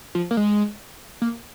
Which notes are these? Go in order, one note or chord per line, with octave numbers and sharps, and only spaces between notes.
F3
A#3
G#3
A#3